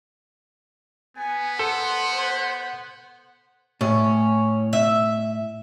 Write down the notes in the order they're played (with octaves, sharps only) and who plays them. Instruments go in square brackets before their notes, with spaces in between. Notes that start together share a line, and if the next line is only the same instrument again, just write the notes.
[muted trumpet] B3 [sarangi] G#5
[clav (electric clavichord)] A4 [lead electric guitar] C5 [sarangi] F#5
[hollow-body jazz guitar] A2 [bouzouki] C#4
[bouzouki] E5